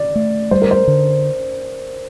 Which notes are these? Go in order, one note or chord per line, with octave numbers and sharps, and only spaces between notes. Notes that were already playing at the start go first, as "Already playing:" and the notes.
Already playing: D5
A3
G3 C5
A#4
C5
D3